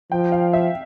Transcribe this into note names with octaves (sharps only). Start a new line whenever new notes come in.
F3 G5
F5
E5